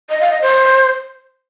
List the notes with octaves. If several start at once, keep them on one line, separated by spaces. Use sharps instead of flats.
D#5
F5
D#5
C5